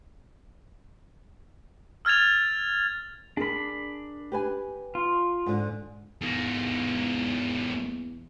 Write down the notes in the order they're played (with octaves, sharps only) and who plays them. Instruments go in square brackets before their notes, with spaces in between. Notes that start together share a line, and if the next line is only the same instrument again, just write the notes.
[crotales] E6 F6 G#6 A6 F7
[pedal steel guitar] D4 B5 [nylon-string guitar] G#4 A#4
[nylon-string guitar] G4 B4 G#5
[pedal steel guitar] F4
[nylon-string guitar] G#2 D3
[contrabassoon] E2 [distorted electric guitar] G#2 A#3